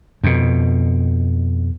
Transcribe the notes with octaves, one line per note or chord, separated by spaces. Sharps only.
F2 B2